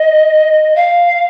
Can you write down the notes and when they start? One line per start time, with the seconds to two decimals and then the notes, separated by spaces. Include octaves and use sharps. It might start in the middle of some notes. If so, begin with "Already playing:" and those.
Already playing: D#5
0.76 F5